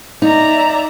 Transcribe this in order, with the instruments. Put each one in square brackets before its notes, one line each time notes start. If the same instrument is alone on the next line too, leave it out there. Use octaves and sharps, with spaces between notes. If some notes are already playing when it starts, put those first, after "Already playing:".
[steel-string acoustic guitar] D#4 [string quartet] D5 E5 A#5